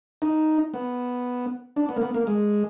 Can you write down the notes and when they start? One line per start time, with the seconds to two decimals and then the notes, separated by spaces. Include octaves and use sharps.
0.22 D#4
0.74 B3
1.76 D4
1.89 B3
1.96 A#3
2.01 B3
2.14 A#3
2.27 G#3